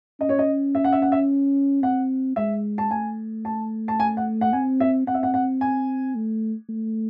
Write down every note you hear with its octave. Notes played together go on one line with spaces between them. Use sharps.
C#4 D#5
C#5
D#5
E5
F#5
E5
F#5
E5
C4 F#5
G#3 E5
A5
A3 G#5
A5
A5
G#5
F#5
F#5
C4 G#5
E5
C4 F#5
E5
F#5
F#5
G#5
A3
A3